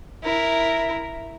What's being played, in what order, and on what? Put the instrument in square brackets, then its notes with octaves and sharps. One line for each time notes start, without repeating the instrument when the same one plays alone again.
[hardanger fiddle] E4 A#4